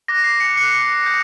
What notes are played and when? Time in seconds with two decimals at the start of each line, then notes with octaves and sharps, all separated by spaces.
0.08 D6 F#6 A#6
0.24 C7
0.40 C#7
0.56 D6 F#6 C#7
1.05 D#6 G6